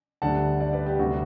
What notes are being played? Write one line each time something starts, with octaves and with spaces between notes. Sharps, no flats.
D2 D3 G3 F#5 A5
D5 F#5
B4 D5
G4
D2 C3 G3 F#4